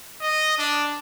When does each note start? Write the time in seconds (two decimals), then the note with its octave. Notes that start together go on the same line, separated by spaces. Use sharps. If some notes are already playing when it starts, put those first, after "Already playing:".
0.21 D#5
0.58 D4